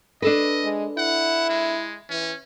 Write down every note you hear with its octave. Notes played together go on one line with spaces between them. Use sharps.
D4 A4 B4 D#5
G#3
E4 F#5
G#3
E3 C#4